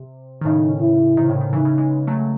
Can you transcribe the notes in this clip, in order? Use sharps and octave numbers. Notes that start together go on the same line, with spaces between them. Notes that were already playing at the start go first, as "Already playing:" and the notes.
Already playing: C3
D#3
A2 C#3 D#4
E4
C3 D#3
A2 C#3
C3 D#3
C#3 E3 D#4
C#3 E3
E3 G#3
F#3 A3